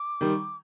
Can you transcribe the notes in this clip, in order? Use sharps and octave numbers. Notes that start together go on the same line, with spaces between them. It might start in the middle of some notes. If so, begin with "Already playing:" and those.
Already playing: D6
D#3 G3